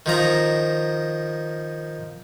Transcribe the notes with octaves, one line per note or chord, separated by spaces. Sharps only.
D#3 F3 A#5